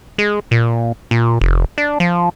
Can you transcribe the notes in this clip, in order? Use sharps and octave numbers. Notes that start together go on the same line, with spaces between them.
G#3
A#2
A#2
F1
D4
F3